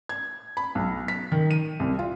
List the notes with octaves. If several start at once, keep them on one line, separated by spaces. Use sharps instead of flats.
G#6
B5
B1
B6
D#3
D#7
C2
F4